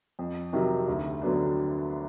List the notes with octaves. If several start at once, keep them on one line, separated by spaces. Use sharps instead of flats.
F2
C3 D#3 F#3
D2
D3 F#3 B3 D4